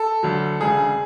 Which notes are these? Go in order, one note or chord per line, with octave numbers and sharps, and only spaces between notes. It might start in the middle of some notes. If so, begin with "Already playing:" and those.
Already playing: A4
D2 D3 F#3
E1 D2 C#3 G#4